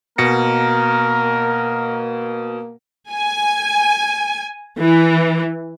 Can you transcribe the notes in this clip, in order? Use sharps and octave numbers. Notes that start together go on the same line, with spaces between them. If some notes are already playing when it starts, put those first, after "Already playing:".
B2 A#3 A#4 A#6 C#7
G#5
E3